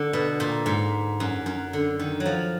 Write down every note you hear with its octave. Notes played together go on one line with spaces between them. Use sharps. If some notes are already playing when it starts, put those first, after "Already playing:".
Already playing: D3
B2
A#2
G#2
F#2
F#2
D3
D#3
F#3
F3